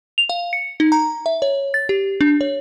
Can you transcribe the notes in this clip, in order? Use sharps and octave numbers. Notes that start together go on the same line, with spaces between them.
F7
F5
C#7
D#4
A#5
E5
C#5
A6
G4
D4
C#5